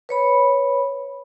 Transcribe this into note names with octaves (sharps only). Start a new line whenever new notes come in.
B4 C#5 B5